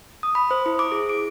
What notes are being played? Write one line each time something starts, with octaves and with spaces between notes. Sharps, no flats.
D#6
B5
C5
E4
D6
G#4
D7